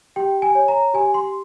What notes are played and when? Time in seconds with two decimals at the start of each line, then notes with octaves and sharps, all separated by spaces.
0.16 G4 G5
0.42 G#5
0.55 C#5
0.68 A#5
0.94 G4 G#5
1.14 C6